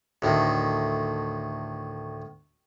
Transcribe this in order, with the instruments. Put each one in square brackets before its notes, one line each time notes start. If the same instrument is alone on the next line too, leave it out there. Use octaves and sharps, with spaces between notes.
[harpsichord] D2 A2 D#3